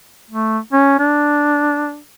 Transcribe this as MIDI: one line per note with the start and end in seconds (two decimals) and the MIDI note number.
0.31 0.59 57
0.73 0.96 61
0.99 1.99 62